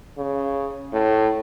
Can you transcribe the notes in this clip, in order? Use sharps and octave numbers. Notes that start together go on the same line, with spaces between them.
C#3
A2